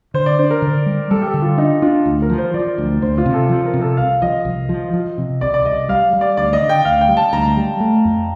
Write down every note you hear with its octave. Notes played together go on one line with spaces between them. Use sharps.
D3 C5
D5
D4 C5
A#4
D3
G3
G3 A4
G4
A4
D3
F4
D4 D#4
D4 F4
D2
A#4
F3
C5
F3 D5
D2
D2 C5
F4
C3
A4
F3
A#4
C3
A4
C2 F5
F3 D#5
C2
F3
F3
C3
C2 D5
D5
C2 D#5
G3 F5
G3
D5
D2 D5
D#5
D3
G5
D2 F5
G5
G3
A5
D2 A#5
G3
A3
F2